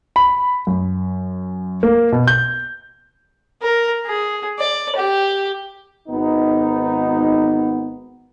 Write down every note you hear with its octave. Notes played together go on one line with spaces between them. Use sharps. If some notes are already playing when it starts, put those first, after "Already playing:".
B5
F#2
A#3
B2
G6
A#4
G#4
D5
G4
G#1 B3 D#4